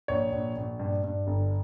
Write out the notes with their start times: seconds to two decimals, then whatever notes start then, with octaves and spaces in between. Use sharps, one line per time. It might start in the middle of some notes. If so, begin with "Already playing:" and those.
0.08 A#1 C#5
0.32 A#1
0.57 A#1
0.79 G2
1.04 G2
1.27 G1